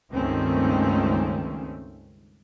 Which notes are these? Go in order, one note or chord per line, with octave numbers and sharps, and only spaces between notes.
C#2 G2 D#3 A3 C4 C#4